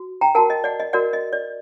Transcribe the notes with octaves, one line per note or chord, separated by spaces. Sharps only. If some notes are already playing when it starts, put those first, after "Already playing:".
Already playing: F#4
G5 A#5
F#4 A#4 F#5 A5
D#5
D5 F#5
D#5
F#4 A#4 D5 F#5
D#5
D5